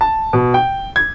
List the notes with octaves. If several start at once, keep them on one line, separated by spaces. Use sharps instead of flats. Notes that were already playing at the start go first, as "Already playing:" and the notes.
A5
B2
G5
G#6